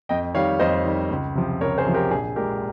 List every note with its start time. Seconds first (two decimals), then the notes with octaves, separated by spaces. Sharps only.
0.09 F2 D#5 G5
0.34 D#3 G3 C#5 F5
0.60 F2 C5 D#5
0.85 D#3 G3
1.10 C#2
1.35 C3 F3
1.61 C#2 A#4 C#5
1.78 G#4 C5
1.85 C3 F3
1.94 G4 A#4
2.11 A#1 G#4
2.36 A#2 G#3 G4 A#4